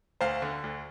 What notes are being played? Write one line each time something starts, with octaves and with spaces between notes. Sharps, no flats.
D2 C5 F5
D3
D2